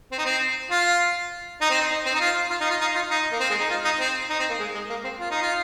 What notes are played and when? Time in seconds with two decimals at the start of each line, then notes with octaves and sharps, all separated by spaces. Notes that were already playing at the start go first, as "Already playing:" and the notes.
0.12 C4
0.18 D#4
0.25 C4
0.71 F4
1.61 D#4
1.70 C4
1.80 D#4
1.91 D#4
2.06 C4
2.14 D#4
2.20 F4
2.50 F4
2.61 D#4
2.70 F4
2.81 D#4
2.95 F4
3.10 D#4
3.32 A#3
3.40 C4
3.50 G#3
3.60 D#4
3.70 F4
3.85 D#4
4.00 C4
4.30 D#4
4.39 C4
4.50 A#3
4.59 G#3
4.74 G#3
4.89 A#3
5.04 C4
5.20 F4
5.31 D#4
5.42 F4